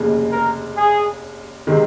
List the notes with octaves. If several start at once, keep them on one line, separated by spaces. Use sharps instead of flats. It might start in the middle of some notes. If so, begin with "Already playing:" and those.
Already playing: F1 D#2 C#3
A#4
G#4
C3 D#3 G#3 C4